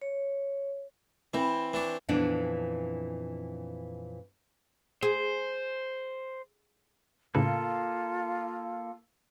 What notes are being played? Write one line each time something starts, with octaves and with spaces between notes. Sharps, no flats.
C#5
E3 C4 E4
E3 D4 C#6
F2 A#2 E3 B3 D4
G#4 C5
A2 C#3 A#3 F4 A4 B4